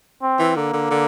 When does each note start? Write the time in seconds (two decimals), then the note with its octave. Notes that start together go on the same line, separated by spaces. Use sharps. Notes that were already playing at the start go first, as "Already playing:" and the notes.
0.22 C4
0.39 E3
0.56 D3 A#3
0.73 D3
0.91 D3